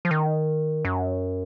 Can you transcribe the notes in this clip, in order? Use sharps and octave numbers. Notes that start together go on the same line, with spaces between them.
F3
D#3
F#2